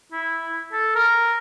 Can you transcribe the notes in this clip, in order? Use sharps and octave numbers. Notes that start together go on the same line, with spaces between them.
E4
A4
A#4